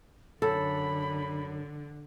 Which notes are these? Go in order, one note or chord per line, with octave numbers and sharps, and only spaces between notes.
F#2 D3 A4 B5